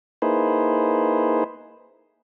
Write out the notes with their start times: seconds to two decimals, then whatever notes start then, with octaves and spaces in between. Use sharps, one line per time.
0.22 A#3 D#4 E4 G#4 B4 C5